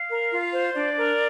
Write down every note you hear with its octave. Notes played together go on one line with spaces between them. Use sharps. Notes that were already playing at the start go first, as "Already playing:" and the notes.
Already playing: F5
A#4
F4
C5
D4 D5
A#4